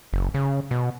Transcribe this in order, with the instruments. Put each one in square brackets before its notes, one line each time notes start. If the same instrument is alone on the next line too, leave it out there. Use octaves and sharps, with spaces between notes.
[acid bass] F#1
C#3
B2